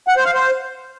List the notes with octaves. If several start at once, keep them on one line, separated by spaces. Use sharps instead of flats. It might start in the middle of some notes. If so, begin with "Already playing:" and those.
F#5
C5
F5
C5